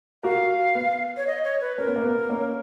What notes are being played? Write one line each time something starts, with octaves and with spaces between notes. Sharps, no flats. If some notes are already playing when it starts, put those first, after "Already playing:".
F#4 A#4 F5
B3
C#5
D#5
C#5
B4
C#4 A#4
B3
A#3
B3
A#3 C#4